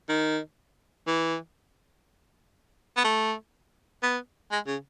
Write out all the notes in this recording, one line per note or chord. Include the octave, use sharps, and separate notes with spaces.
D#3
E3
B3
A3
B3
G#3
C#3